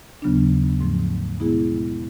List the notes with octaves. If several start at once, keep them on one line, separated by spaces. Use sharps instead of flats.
D#2 C#3 F#3 B3 D4
G#2 F3 A3
B2 G#3 B3 E4 G#4